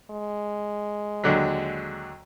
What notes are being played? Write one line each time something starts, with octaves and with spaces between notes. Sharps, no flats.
G#3
D#2 D3 F#3